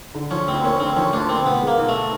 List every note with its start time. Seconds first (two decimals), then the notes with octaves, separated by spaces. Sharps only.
0.15 D3
0.31 F3 C#4
0.48 D2 C4
0.64 A#3 C#4
0.80 D3 C4
0.97 F3 C#4
1.13 D2 D4
1.29 A#3 C4
1.45 B2 B3
1.62 G#3
1.67 A#3
1.78 B1
1.89 A3